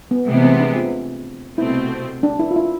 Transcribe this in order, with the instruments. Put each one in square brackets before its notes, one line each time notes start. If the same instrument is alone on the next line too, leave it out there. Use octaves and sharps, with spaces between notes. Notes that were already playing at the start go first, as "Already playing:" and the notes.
[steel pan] B3
[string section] C3 E3 G#3 B3 [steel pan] A3
[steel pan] C4
D4
F4
[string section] C2 B2 A3 C4 [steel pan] E4
[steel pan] D4
E4
F4
E4